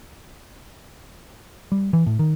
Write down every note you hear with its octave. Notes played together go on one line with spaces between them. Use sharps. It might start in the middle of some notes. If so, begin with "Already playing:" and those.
G3
E3
A2
D#3